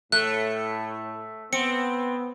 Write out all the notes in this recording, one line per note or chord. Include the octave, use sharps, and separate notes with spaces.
A2 A3 F#6
B3 C4 C#7